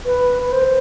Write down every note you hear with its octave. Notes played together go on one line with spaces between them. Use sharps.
B4
B4
C5